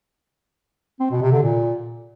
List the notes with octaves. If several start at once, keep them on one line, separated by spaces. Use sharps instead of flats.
C4
B2
C3
D3
A#2